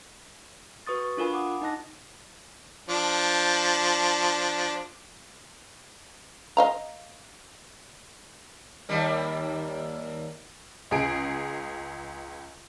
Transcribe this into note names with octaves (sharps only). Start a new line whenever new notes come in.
F#4 B4 C#6 D#6 A6
C#6
D4 F4 A#4 G#5 B5
F#5 D6 D#6
D#4 D#5 A5 F#6 A#6
F3 D4
D#5 F5 A#5
D#2 G3 A#3
C#2 G#4 D7